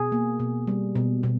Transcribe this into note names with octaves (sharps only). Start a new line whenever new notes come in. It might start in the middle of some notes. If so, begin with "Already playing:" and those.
Already playing: B2 G#4
A#3
B2
G3
B2
B2